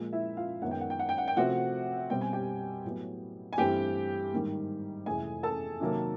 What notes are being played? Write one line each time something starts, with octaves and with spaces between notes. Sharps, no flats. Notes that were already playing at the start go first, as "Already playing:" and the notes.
Already playing: A#2 F3 G#3
E4 E5
F4 F5
F#2 D#3 G#3 B3 F#5
G5
F#5
G5
F#5
G5
F#5
G5
C3 F3 A3 C4 F#4 F#5
B2 G3 C4 G5
G#5
G4 G5
A2 F#3 B3
G#5
G2 E3 A3 C4 G4 G5
G#2 D#3 G3 A#3
F2 C3 E3 A3 G#4 G#5
A4 A5
C3 D#3 F#3 A#3